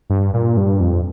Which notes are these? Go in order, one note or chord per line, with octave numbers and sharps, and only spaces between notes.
G2
A#2
G2
F2